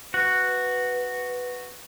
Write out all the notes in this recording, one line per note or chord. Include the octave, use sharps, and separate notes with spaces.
F#4 B4